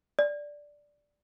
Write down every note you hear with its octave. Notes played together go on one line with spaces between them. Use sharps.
D5